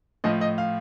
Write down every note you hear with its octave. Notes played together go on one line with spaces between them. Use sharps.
A2 F3 D#5
D#5
F5